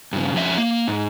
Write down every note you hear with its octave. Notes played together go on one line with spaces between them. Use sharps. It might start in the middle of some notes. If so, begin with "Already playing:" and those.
G2 C#3
F2 C#4 E5
A#3
G#2